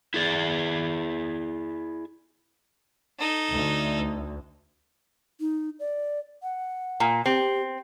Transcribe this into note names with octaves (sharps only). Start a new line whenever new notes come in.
E4 G#4 D5
D#4 A4
D2
D#4
D5
F#5
A#2
C4 G4